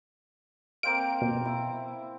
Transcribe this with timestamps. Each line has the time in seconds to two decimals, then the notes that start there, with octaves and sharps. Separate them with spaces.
0.83 A#3 C4 F5 D7
1.22 B2
1.45 E4